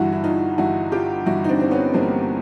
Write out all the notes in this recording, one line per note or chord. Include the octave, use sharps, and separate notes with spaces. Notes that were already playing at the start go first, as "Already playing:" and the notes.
Already playing: G1 G2 E3 E4 F#4
E4
D#4 F4
G1 G2 E3 E4 F#4
F4 G4
G1 G2 E3 E4 F#4
D#4
C4 D4
C4
B3 C#4
G1 G2 E3 A#3 C4